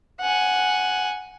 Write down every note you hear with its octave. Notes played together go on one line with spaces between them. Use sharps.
F#5 G#5